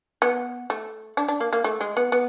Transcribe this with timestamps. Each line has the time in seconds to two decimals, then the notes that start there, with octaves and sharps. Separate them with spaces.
0.22 B3
0.70 A3
1.17 D4
1.28 D4
1.40 A#3
1.53 A#3
1.64 A3
1.81 G#3
1.97 B3
2.12 B3